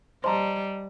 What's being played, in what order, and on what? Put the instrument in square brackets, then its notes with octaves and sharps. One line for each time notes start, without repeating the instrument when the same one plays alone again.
[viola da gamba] G3 [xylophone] C5 C6 [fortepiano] D#5 A5 A#5